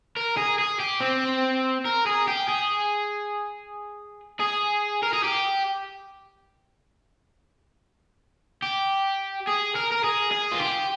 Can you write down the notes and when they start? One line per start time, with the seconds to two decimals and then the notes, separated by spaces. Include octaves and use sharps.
0.16 A#4
0.37 G#4
0.59 G#4
0.80 G4
1.00 C4
1.85 A#4
2.07 G#4
2.28 G4
2.49 G#4
4.40 G#4
5.03 A#4
5.13 G#4
5.24 G4
8.63 G4
9.47 G#4
9.75 A#4
9.92 A#4
10.04 G#4
10.32 G#4
10.52 F4
10.60 G4